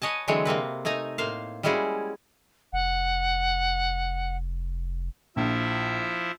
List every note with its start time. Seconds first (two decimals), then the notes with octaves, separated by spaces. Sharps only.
0.02 B4 C#5 D#5 G#5 A5
0.28 D3 E3 F#3 G#3 C4 C#5
0.45 C3 A#3 C4 B4
0.85 A3 D#4 G#5 A#5
1.18 A2 A#3 C5 F5
1.63 G3 G#3 C#4 E4 F#4 G#4
2.73 F1 F#5
5.36 A#1 F3 E4 E5